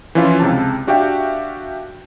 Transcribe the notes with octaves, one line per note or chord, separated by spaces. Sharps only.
E3 F3 C#4 E4 F4
C#2 C3 A5
D4 F#4 G4 E5 F5 G5